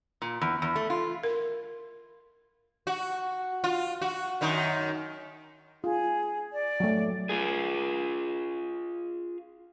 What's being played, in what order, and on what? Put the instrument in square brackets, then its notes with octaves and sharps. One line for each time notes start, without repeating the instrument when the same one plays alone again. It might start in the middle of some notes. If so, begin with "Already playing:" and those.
[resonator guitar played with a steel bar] A#2
E2
E2
A3
F4
[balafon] A#4
[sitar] F#4
F4
F#4
F#2 D#3 D#4
[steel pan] F4 [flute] G#4
[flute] D5
[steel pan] F#3 A3
[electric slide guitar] F4 G#4